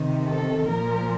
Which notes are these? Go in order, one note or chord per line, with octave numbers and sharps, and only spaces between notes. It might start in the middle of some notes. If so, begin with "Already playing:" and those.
Already playing: C3 D#3
A4
A#2 F3 A#4